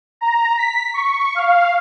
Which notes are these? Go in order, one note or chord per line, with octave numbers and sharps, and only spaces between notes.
A#5
B6
C#6
F5